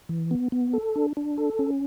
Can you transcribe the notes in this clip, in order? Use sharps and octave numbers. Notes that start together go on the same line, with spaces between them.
E3
B3
B3
A4
D4
D4
A4
C#4